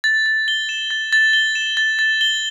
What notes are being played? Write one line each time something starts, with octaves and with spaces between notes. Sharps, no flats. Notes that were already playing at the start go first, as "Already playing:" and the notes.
A6
A6
G7
E7
A6
A6
G7
E7
A6
A6
G7